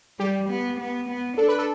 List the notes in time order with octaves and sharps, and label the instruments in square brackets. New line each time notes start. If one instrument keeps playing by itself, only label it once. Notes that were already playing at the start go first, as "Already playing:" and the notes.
[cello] G3 [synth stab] G4
[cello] B3
B3
B3
[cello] D4 [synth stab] A4
[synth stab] B4
A4